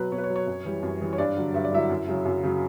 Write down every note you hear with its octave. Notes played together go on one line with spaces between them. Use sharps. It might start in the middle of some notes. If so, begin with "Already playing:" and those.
Already playing: B2 F#3 B4
B2 C#5
B4
C#5
F#3
C#5
F#2
E3 G3
F#2
E3 G3
C#5
G2 D4 D5
D3 F#3
G2 E5
D5
D3 F#3 E4 E5
F#2
C#3 F#3
F#2
C#3 F#3